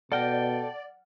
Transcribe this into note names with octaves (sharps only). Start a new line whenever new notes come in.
B2 A4 D5 F#5 G5 F6 A#6